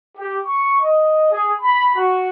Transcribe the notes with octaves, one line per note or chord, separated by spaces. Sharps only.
G4
C#6
D#5
G#4
B5
F#4